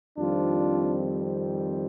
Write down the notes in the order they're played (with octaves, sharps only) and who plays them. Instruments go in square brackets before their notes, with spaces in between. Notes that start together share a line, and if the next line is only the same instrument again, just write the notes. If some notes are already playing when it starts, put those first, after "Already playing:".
[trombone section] F2 D#3 G3 C4 D4 F4